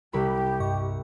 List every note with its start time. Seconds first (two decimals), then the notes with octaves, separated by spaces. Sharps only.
0.13 C2 G4 B5
0.60 G2 D#5 C#6